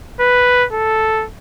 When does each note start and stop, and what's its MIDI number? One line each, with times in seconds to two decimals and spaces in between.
0.20 0.66 71
0.73 1.26 69